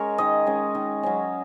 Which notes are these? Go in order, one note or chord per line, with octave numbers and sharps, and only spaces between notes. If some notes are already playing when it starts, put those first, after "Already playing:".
Already playing: G#3 C#4 A#4 C#5
D#3 D#5
G#3 C#4
D#3
F#3 C#4